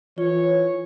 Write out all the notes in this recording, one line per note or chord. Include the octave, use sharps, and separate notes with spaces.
E3 F4 C#5